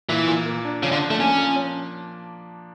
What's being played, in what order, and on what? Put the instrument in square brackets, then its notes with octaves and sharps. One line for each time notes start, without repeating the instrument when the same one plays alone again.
[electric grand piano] A#2 [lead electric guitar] E3
[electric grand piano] A#2
A#3
D4
[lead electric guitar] C#3 [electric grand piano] F3
[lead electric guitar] D3
[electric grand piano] D4
[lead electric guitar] A3
[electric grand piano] A#3 [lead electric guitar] C#4
[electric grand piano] F3